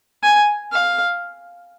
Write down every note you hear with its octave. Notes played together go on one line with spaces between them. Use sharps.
G#5
F5